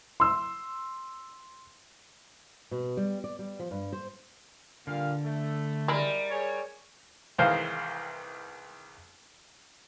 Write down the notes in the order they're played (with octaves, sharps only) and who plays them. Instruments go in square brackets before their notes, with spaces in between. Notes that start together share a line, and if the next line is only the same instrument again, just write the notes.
[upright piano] C6 E6
[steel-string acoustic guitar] B2
G3
D5
G3
F3
G2
C5
[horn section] A#2 G3 F5 [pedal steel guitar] D3
[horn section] A3
[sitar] G3 A#4 [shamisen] G#3 E4
[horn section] G#4 C#5
[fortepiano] C2 D#3 E3 G#3 C5 F5